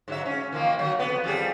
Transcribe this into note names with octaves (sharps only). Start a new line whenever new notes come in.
G#2 F#3 E5
C#4
D#3 F3 A#3
F#3
F2 C#3 B3
F2 G3 G#4